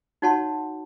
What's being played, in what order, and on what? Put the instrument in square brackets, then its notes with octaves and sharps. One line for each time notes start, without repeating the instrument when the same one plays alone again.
[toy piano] D#4 F#4 C#5 F#5 A5 C6